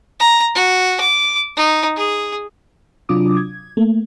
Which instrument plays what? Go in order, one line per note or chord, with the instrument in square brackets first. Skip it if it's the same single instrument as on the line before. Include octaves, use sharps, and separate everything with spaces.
[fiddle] A#5
F#4
D6
D#4
G#4
[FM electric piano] C3 F#3 D4 F4 D6 D#6
G#6
A3 A#3